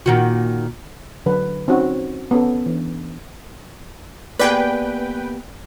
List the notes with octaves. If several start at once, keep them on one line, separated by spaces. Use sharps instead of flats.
A#2 D#3 F#4
D3 F#3 B4
C4 C#4 D#4 F#4
B3 C#4 A4
E3 D4
A#3 B3 G4 G#4 B4 D5 G5